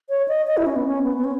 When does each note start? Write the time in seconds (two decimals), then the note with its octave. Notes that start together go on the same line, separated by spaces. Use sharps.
0.09 C#5
0.28 D#5
0.47 D#5
0.57 E4
0.66 C#4
0.76 B3
0.86 C#4
1.04 B3
1.18 B3
1.24 C#4